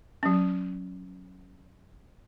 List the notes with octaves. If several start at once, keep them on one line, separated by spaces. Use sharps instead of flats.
F#3 C#4